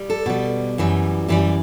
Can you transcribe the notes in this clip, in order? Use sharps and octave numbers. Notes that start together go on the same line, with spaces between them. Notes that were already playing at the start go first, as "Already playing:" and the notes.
Already playing: G3
A4
B2 G3
F#2 E3 G3
F#2 E3 G3 G4